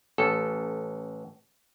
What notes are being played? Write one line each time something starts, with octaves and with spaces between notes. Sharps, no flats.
A1 A4